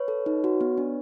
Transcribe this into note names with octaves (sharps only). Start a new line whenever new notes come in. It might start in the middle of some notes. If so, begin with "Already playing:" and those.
Already playing: B4 C#5
A4
D#4
F#4
B3
D4